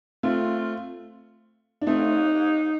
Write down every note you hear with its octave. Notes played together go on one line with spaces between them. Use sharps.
A3 C4 F4
D4
A3 C4 D#4